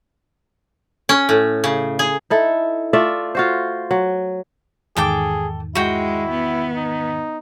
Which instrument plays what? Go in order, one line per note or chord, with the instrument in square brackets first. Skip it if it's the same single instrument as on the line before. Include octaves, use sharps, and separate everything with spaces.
[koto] C#4
A2
C#3
G#4
[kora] D#4 E4 A4
A3 F4 D5 E5
F4 F#4 C5
F#3
[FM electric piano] E2 G#2 D#3 [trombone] G#4 [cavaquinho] A4 G5 D6
[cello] G#3 [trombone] E4 [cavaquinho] F#4 G5
[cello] B3
[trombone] D#4